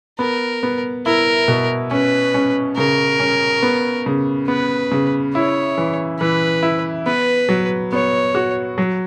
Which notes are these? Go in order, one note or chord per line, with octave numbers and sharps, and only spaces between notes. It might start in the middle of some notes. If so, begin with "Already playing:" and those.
B3 A#4
B3
E4 A#4
B2
C#4 B4
C#4
C#3 A#4
C#4
B3
C#3
B3 B4
C#3
E4 C#5
E3
E3 B4
E4
B3 B4
F#3
B3 C#5
F#4
F#3